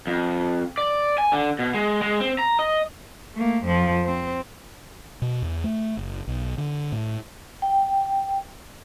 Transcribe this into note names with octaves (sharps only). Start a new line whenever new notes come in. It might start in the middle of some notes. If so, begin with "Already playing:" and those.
F2
D5
G#5
D3
B2
G#3
G#3
C4
A#5
D#5
A3 A#3
F2 F3
C4
B2
E2
A3
F#1
B1
D3
A2
G5